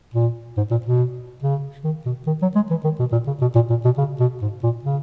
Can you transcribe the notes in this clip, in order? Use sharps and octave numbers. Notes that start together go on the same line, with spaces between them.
A#2
G#2
A#2
B2
C#3
D#3
B2
D#3
F#3
G#3
E3
D#3
B2
A#2
C#3
B2
A#2
A#2
B2
C#3
B2
G#2
A#2
C#3